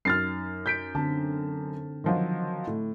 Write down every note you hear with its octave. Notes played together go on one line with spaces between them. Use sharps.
F#2 D#4 F6 A6 C7
G6 B6 D7
D3 C4 A5
D#3 F3 F#3
A2